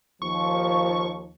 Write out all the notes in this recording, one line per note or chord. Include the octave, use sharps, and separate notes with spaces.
D#2 F3 C#6